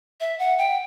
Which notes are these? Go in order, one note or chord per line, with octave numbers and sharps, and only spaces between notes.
E5
F#5
G5